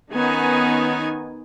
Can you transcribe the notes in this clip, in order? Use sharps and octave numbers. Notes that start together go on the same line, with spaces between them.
D#3 B3 C#4 D#4 G#5